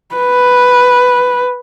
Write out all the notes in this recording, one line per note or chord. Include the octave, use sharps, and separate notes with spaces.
B4